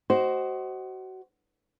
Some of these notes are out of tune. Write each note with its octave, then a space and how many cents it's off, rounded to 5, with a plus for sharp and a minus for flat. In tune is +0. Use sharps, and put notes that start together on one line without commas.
F#4 +25 C5 +0 D#5 +0